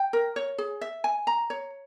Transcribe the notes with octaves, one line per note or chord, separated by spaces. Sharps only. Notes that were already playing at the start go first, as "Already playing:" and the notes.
Already playing: G5
A#4
C#5
G#4
E5
G#5
A#5
C#5